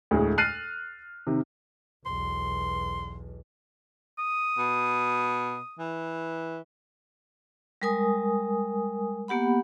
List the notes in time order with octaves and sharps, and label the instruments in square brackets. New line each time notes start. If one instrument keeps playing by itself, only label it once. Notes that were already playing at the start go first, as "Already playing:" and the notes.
[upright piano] D2 A2 G#3 A3
F6 F#6 A6 C7 D#7
C3 D#3
[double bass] B1 E2 [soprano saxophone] C6
[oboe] D#6
[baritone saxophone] B2
E3
[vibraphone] G3 G#3 A#4 G#5 D#6
A#3 B3 G4 F#5 B5